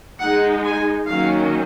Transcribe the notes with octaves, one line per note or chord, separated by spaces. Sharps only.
G#3 D#4 F#5
G#5
D#3 F#3 A#3 C#4 F5